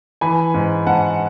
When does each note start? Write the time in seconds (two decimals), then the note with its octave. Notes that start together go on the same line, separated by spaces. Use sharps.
0.21 E3 G#5 B5
0.54 G#2
0.87 G#2 F#5 A5